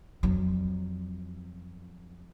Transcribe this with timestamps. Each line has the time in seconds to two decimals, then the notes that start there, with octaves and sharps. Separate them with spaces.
0.23 F2 F#3